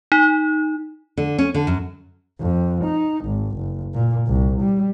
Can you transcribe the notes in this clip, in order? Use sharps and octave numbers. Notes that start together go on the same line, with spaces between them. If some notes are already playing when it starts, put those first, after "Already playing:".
D#4
D3
C#4
D3
F#2
F2
D#4
G#1
F#1
A#2
C2
G3